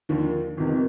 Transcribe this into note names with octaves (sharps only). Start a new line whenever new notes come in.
D#2 D3 F3
G1 F2 C3 D#3